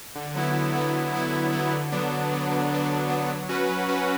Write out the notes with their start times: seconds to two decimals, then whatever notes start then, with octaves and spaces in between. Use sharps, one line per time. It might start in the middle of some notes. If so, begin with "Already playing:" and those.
0.15 D3
0.35 F#3 B3 E4
0.55 D3
0.74 F#3 B3 E4
0.93 D3
1.13 F#3 B3 E4
1.33 D3
1.52 F#3 B3 E4
1.72 D3
1.92 F#3 B3 D4
2.11 D3
2.32 F#3 B3 D4
2.51 D3
2.70 F#3 B3 D4
2.91 D3
3.09 F#3 B3 D4
3.30 F#3
3.49 C#4 F#4 B4
3.69 F#3
3.89 C#4 F#4 B4